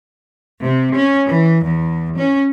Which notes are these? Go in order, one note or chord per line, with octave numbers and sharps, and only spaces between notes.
C3
C#4
E3
E2
C#4